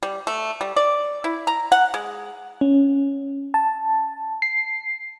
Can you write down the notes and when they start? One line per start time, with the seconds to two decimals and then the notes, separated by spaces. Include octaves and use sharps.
0.03 G3
0.27 A3
0.61 G3
0.76 D5
1.24 E4
1.47 A#5
1.72 F#5
1.94 G#3
2.61 C#4
3.54 A5
4.42 C7